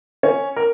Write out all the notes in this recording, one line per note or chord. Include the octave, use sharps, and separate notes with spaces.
C#4 C#5
A#4